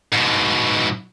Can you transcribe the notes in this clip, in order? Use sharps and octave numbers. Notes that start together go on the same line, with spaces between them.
G#2 B2